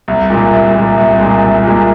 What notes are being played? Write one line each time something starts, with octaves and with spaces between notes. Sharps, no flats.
C2
A#2 G#3
C2
A#2 G#3
C2
A#2 G#3
C2
A#2 G#3